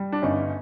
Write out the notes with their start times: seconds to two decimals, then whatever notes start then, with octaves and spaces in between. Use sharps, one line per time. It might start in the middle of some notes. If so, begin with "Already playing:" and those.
Already playing: G3
0.12 D4
0.22 G1 C#4 D#4